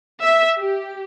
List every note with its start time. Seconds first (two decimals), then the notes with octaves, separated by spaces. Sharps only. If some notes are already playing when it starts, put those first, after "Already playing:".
0.22 E5
0.60 G4